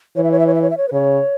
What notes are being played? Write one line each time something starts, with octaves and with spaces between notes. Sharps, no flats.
E3 C#5
E5
C#5
E5
C#5
E5
C#5
E5
C#5
B4
C#3 C#5